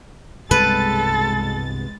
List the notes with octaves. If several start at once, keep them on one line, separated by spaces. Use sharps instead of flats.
C2 G2 B2 G#3 A4 B4 A6